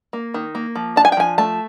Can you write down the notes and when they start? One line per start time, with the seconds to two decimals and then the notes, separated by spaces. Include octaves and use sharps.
0.13 A#3
0.34 D#3
0.55 A#3
0.76 F3
0.96 D4 A5
1.05 G#5
1.12 G5
1.17 F3 G#5
1.38 A3 A5